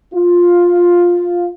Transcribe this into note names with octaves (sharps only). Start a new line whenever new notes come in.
F4